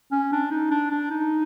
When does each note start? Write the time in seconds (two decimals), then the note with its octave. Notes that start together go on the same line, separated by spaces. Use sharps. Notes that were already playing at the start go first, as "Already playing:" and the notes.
0.12 C#4
0.32 D4
0.51 D#4
0.71 D4
0.91 D4
1.11 D#4